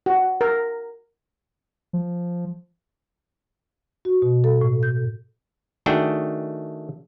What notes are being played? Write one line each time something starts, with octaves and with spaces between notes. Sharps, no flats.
F#4
A#4
F3
F#4
B2
A4
A2
G6
D#3 A3 D4 F#4 G#4 G5